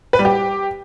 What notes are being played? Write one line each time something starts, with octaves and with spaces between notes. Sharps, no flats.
B4
G3
G4